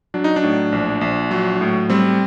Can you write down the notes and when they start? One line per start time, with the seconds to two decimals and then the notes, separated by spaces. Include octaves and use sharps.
0.14 F#3 D4
0.24 D#4
0.36 D4
0.43 A2
0.72 A#1
1.01 A#1
1.31 F#3
1.61 A2
1.90 G3 C4